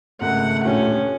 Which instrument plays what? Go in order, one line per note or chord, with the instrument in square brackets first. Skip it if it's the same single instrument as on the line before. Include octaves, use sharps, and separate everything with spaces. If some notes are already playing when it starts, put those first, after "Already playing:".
[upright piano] G#1 C#3 A#4 [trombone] A3 [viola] F#5
[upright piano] D#1 A1 D3 [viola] C#4